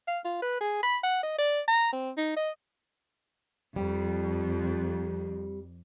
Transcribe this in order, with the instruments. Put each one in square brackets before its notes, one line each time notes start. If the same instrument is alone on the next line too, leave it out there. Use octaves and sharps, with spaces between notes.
[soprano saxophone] F5
F4
B4
G#4
B5
F#5
D#5
D5
A#5
C4
D#4
D#5
[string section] F2 [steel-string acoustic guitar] G3